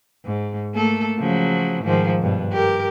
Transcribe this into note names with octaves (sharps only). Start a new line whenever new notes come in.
G#2
A3 A#3 A4
C#3 F3 F#3
G#2 D#3 F3
G2 B2
G4 A#4